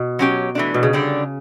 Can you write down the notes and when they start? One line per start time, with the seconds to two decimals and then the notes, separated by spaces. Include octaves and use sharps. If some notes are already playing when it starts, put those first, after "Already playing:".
Already playing: B2
0.19 F#3 C#4 G4
0.55 E3 A3 D4
0.74 B2
0.83 C#3
0.93 D3 G3 D4